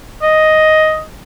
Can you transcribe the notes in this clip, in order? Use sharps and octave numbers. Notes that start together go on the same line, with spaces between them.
D#5